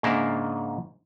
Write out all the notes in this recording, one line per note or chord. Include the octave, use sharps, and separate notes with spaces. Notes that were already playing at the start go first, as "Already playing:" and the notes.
G#2 C#3 A#3 D4 A#4 E5